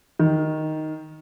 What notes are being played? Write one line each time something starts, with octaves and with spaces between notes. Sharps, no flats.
D#3